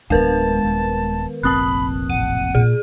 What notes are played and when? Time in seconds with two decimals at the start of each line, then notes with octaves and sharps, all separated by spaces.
0.10 D1 D#3 G#3 B3 A#4 B4 A5
0.65 D#1
1.43 F1 A#1 C4 A5 B5 D#6 F#6
2.10 A1 F#5 D#7
2.55 A#2 G#4